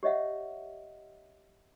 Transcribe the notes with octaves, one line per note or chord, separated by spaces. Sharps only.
G4 C#5 D#5 E5 F#5